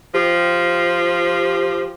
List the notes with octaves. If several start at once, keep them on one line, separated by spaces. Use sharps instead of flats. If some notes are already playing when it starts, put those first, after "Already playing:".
F3 G4